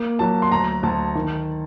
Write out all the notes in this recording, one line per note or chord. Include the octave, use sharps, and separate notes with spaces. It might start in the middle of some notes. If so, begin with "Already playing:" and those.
Already playing: A#3
F#3 A5
C6
D2 A#5
D2 A5
D#3